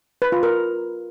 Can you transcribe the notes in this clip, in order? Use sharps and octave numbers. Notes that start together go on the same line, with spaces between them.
B4
F4
A#4